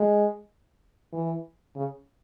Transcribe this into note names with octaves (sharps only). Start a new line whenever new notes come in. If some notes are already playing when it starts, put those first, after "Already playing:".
Already playing: G#3
E3
C#3